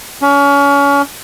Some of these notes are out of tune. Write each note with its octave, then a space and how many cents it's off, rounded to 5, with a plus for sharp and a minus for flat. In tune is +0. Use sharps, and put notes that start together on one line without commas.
C#4 +30